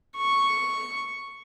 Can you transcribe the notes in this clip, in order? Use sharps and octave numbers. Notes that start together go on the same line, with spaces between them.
C#6